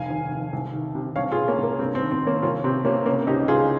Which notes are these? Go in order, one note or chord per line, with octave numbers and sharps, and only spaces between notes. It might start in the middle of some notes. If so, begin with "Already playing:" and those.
Already playing: F1 C2 F5 G#5
D#2
F1
C2
D#3
C3
C2 C#5 F5
F4 G#4
A#2
A#3 C#4
C2
A#3
G2 C4
C4
D#3
C4
D#3
A#3 C#4
C2 C#4 F4
C3 C4
C3 A#3 C#4
C#3 A#3 C#4
C#2 D#4 G4
C#2 F4 G#4